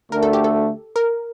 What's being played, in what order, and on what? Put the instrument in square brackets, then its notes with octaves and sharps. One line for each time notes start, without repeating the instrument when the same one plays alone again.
[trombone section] D2 D3 A3 [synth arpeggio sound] A#4
[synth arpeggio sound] A4
G4
A4
A#4